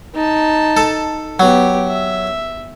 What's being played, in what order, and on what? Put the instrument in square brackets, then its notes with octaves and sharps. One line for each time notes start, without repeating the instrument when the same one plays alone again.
[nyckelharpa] D#4 A5
[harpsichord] A4
[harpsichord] F#3 [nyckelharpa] B3 G4
[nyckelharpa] E5